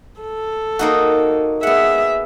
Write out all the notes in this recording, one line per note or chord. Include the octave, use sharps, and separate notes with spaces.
A4
A#3 D#4 F#4
B3 G#4 E5 F#5